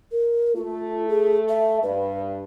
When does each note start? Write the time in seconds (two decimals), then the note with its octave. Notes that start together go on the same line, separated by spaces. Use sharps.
0.12 A#4
0.56 A3 F4
1.08 G#4
1.49 E5
1.83 G2 B4